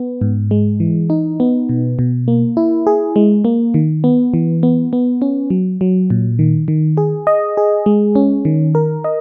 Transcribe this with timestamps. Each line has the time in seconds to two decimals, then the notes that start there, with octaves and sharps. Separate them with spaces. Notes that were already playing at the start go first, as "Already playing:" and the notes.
Already playing: B3
0.21 G#2
0.51 G#3
0.80 E3
1.10 D#4
1.40 B3
1.69 B2
1.99 B2
2.28 A#3
2.57 E4
2.87 G#4
3.16 G#3
3.45 A#3
3.74 D#3
4.04 B3
4.34 E3
4.63 B3
4.93 B3
5.22 C#4
5.50 F#3
5.81 F#3
6.10 A#2
6.39 D#3
6.68 D#3
6.97 G#4
7.27 D#5
7.57 G#4
7.86 G#3
8.15 C#4
8.45 D#3
8.75 A#4
9.04 D#5